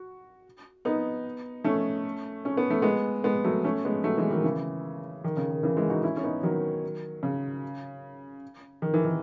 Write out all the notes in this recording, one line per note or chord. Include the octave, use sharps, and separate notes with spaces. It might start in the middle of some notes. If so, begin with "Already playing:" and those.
Already playing: F#4
B3 D#4
A3 C#4
C#4
B3
A3
G#3 B3
G#3 B3
F#3 A3
A3 C#4
G#3 B3
F#3 A3
E3 G#3
D#3 F#3
C#3 E3
D#3
C#3
D#3
C#3 E3
E3 G#3
D#4 F#4
C#4 E4
C#4
B3 D#4
D#3 F#3
C#3
D#3
E3
D#3